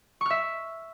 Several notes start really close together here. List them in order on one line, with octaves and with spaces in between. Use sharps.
C#6 F6 E5